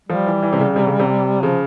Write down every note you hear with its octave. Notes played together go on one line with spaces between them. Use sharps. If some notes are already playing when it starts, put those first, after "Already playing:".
F3 G3
E3
E3
C3
C#3
C3
C#3
C3
C#3 F3